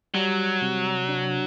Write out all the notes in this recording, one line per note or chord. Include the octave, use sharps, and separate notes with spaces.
F#3 G3
C3
D4